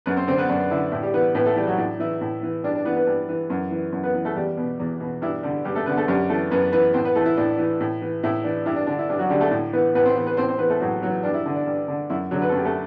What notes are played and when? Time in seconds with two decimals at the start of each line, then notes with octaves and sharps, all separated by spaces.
0.06 F#2 B3 B4
0.16 C4 C5
0.27 D3 C4 C5
0.38 B3 B4
0.49 F#2 D4
0.71 D3 E4
0.92 A2 E4
1.02 G3 G4
1.14 E3 B3 B4
1.35 A2 B3 B4
1.46 A3 A4
1.56 E3 G3 G4
1.67 F#3 F#4
1.78 A2 D4
2.00 E3 E4
2.21 A2
2.43 E3
2.64 G2 D4
2.75 D4
2.85 E3 B3 B4
2.96 B3 B4
3.07 G2
3.29 E3
3.50 F#2
3.71 E3
3.93 F#2
4.03 B3 B4
4.14 E3
4.25 A3 A4
4.36 E2 G3 G4
4.57 B2
4.80 E2
5.00 B2
5.22 G2 E4
5.43 D3 G3 G4
5.65 G2 G3 G4
5.75 A3 A4
5.86 D3 B3 B4
5.97 A3 A4
6.08 F#2 G3 G4
6.29 E3 A3 A4
6.50 F#2 B3 B4
6.72 E3 B3 B4
6.94 A2 C4 C5
7.05 B3 B4
7.15 E3 A3 A4
7.26 E4
7.37 A2 D4
7.58 E3
7.81 A2
8.02 E3
8.23 A2 E4
8.44 E3 D4
8.66 G2 E4
8.76 D4
8.87 D3 D4
8.99 E4
9.09 G2 D4
9.19 F#3 F#4
9.30 D3 G3 G4
9.41 A3 A4
9.51 A2
9.73 E3 B3 B4
9.95 A2 B3 B4
10.05 C4 C5
10.16 E3 B3 B4
10.27 B3 B4
10.37 A2 C4 C5
10.49 C4 C5
10.59 E3 B3 B4
10.70 A3 A4
10.80 A2 F#3 F#4
11.02 E3 F#3 F#4
11.23 G2 D4
11.34 E4
11.46 D3
11.56 D4
11.67 G2
11.88 D3
12.10 F#2 E4
12.31 D3 F#3 F#4
12.42 B4
12.49 A4
12.52 F#2
12.57 G4
12.65 A3 A4